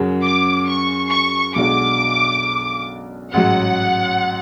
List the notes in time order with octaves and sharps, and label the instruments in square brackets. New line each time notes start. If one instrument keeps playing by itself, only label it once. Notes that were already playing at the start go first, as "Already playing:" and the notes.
Already playing: [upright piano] F#2 C#3 F#3
[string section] D6
C#6
C#6
[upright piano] B1 B2 G#3 D4 F#4 [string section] D6
[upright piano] A1 G#2 F#3 [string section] F#5